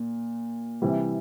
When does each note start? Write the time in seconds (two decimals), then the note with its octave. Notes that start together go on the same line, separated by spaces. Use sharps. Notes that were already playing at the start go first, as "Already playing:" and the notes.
Already playing: A#2
0.82 C3 E3 G3